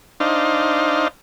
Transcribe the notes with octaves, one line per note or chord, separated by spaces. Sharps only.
D4 D#4 C5 F5